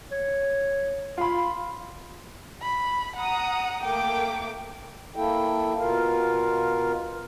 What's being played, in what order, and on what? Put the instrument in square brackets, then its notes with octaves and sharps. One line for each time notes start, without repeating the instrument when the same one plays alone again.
[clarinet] C#5
[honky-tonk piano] F4 B5 [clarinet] C6
[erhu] B5
[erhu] F#5 [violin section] A#5 D#6
[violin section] A3 A#3 D6 [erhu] G5
[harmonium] A#3 E4 A4 G5
B2 F4 A#4 F5